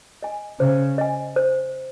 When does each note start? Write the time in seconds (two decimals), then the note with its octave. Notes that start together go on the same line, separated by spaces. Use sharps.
0.23 D#5 G#5
0.60 C#3 C5
0.98 D#5 G#5
1.36 C5